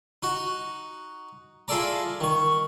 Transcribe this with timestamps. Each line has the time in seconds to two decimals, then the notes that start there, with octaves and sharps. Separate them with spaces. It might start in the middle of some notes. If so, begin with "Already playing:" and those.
0.23 D#4 F#4
1.68 E4 F4 G#4 A4 D5 A#5
2.20 D#3 C#6